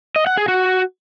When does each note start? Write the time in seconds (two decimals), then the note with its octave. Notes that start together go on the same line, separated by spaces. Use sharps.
0.16 D#5
0.27 F#5
0.37 G#4
0.48 F#4